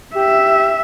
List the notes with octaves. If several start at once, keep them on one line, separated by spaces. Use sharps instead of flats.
G4 E5